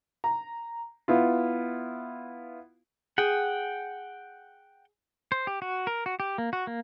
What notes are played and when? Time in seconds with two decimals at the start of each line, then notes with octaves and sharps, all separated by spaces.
0.24 A#5
1.08 B3 E4 F4
3.18 G#4 F#5 G5
5.32 C5
5.47 G4
5.62 F#4
5.87 A#4
6.06 F#4
6.20 G4
6.38 A#3
6.53 F#4
6.67 A#3